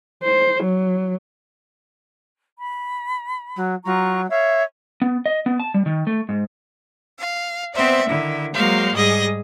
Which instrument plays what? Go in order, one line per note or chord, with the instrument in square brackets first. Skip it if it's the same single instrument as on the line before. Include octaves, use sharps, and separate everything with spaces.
[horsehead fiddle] C5
F#3
[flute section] B5
[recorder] F#3
[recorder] F#3 [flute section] F4 A#5 C#6
[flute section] C#5 F5 [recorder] E5
[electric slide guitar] B3
D#5
B3
A5
G3
D#3
A3
G#2
[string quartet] F5
B3 C4 C5 D5 E5
D3 D#3 E4
F#3 G#3 A#3 C5 F5
G#2 G3 G#4 D#5 D#6 A#6